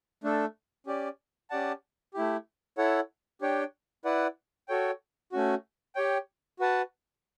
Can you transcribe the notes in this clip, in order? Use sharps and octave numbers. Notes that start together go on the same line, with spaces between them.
A3 D4 A4
C#4 G4 D5
C#4 G4 D5 F#5 A5
A3 E4 G4
E4 A4 C#5 F#5
D4 G4 C#5 G5
E4 B4 D5 F#5
F#4 A4 C#5 G5
A3 C#4 F#4
G4 C#5 G5
F#4 B4 F#5 A5